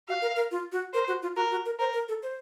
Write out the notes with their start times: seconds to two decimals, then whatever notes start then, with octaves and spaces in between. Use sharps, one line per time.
0.08 F#4 F5
0.22 A#4
0.36 A#4
0.51 F4
0.72 F#4
0.94 A#4 C5
1.08 F#4
1.22 F4
1.36 F#4 A#4
1.51 F#4
1.66 A#4
1.79 A#4 C5
1.93 A#4
2.09 A4
2.23 C5